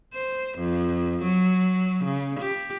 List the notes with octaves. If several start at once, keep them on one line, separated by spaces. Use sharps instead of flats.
C5
F2
F#3
C#3
G4